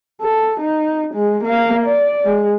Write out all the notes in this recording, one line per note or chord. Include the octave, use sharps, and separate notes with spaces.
A4
D#4
G#3
A#3 F5
D5
G#3